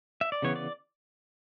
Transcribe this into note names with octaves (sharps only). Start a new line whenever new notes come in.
E5
D5
C#3 E3 B3 C#5
D5